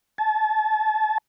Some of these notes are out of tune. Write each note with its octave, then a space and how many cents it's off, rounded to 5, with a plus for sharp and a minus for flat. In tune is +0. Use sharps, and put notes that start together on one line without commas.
A5 -30